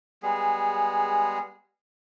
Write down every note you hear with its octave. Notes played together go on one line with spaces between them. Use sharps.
G3 G#3 B3 G#4